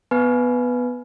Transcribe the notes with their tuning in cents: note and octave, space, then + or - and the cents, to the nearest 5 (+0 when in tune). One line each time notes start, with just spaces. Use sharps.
B3 +0 B4 +0 G#5 +25